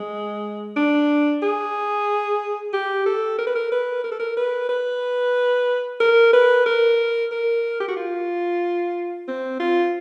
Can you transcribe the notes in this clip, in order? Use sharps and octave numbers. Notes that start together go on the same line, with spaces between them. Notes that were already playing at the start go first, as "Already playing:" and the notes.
Already playing: G#3
D4
G#4
G4
A4
A#4
B4
A#4
B4
A#4
A4
A#4
B4
B4
A#4
B4
A#4
A#4
G4
F#4
F4
C4
F4